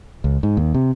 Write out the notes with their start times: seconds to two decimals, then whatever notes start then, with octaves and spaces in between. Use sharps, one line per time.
0.24 C#2
0.43 G#2
0.57 D#2
0.75 C3